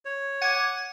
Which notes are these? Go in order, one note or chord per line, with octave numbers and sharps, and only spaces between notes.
C#5
F#5 D6 G#6 D#7